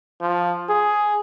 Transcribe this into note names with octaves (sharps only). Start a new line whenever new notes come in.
F3
G#4